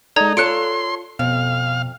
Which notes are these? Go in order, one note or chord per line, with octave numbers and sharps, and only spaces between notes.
G#3 D#4 A4 D5 A#5 G#6
F4 A4 C#5 A5 C6 F#6 C#7 D7
F2 B2 F5